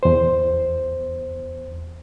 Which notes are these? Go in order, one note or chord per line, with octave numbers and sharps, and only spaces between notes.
E2 C5